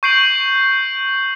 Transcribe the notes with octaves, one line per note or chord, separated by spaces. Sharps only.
C#6 G6 C7 D7 F#7